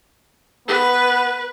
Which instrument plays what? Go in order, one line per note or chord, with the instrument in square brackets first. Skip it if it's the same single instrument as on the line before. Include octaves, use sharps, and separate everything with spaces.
[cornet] B3 [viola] B4